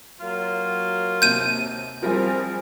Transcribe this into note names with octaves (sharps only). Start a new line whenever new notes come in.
F#3 A#3 F4
D#2 C3 G6 D#7
F3 G3 C4 G#4 A#4